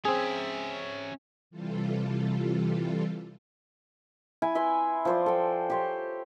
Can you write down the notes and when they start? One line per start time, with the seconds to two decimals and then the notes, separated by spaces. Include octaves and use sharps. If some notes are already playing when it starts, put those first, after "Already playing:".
0.05 C4 C#4 G#4 E5
1.50 C3 E3 G3 F4 A4
4.42 E4 G#5
4.55 B4 E5 C6
5.05 F3 C5 D5
5.26 A4 G5
5.70 G4 C5 C#5